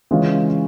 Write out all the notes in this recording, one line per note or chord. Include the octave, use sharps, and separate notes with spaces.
C#3 E3 G#3 C#4 F4